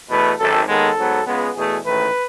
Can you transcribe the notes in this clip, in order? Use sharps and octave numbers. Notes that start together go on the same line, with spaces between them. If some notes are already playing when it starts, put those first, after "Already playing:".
E2 B2 A3 B4
G#1 F#2 D#3 A4
D#2 D#3 G#3 B3 A4
G#2 F#3 B3
C#2 C#3 G#3 B3
E2 B2 A3 G#4
A1 G#2 D#3 A3 B4